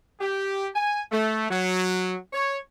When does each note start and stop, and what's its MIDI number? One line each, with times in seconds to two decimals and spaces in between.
0.20 0.68 67
0.75 1.02 80
1.12 1.46 57
1.50 2.16 54
2.33 2.59 73